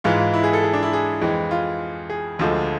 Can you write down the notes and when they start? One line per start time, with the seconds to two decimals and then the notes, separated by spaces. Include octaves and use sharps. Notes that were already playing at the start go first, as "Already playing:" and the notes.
0.04 G#2 E3 G#3 F4
0.19 F4
0.33 E4
0.44 G#4
0.53 A4
0.64 G#4
0.73 D4
0.83 E4
0.93 G#4
1.21 F2 E3 G#3
1.51 F4
2.10 G#4
2.39 D2 D3 F3 G#3